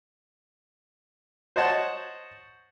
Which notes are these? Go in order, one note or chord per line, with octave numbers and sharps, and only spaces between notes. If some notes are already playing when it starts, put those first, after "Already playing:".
C5 C#5 D#5 F#5 A5